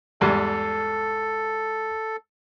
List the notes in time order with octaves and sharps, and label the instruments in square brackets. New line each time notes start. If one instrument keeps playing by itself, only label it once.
[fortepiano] E2 G#2 G3 [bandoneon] A4